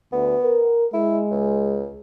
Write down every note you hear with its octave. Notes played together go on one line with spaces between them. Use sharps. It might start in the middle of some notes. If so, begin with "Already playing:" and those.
D2 B3
A#4
G#3 E4
C#2